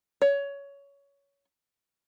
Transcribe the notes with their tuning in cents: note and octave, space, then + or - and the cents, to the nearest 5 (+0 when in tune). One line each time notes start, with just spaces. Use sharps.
C#5 +20